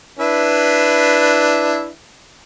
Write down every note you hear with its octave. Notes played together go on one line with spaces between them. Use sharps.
D4 E4 B4